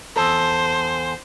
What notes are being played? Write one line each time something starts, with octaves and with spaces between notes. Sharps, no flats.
E2 A4 C5